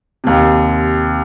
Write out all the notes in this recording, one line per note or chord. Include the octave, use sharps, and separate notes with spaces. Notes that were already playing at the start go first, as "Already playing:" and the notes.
D#2 C3